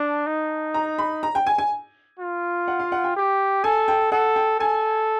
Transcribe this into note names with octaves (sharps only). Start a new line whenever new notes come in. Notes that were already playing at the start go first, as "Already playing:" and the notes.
Already playing: D4 A5
D#4
A#5
B5
A#5
G5
G#5
G#5
F4
F#5
F5
F#5
G5
G4
A4 G#5
G5
A4 F#5
G5
A4 G#5